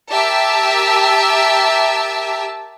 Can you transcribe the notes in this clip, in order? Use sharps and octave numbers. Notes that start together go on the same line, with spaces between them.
G4 A#4 E5 A5